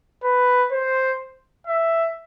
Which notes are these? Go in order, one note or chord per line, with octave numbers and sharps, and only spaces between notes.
B4
C5
E5